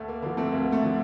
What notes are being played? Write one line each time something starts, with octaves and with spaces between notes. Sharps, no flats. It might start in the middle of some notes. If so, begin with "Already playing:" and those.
Already playing: D2 A3
A#3
D3 F3 A#3
A3 C4
D2 A#3
A3
D3 F3